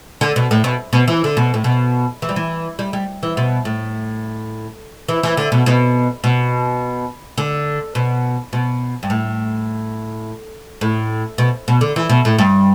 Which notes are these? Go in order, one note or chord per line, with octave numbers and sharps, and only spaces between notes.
D3
B2
A2
B2
B2
E3
D3
B2
A2
B2
E3
G3
E3
G3
G3
E3
B2
A2
E3
E3
D3
B2
B2
B2
D3
B2
B2
G2
A2
A2
B2
B2
D3
E3
B2
A2
G2